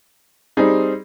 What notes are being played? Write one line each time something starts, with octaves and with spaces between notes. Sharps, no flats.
G3 C4 D#4 G#4